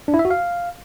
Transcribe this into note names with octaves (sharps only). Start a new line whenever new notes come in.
D4
E4
E5
F#4
F5